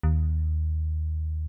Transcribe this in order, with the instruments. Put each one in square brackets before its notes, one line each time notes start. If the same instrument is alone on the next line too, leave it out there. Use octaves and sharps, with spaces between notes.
[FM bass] D#2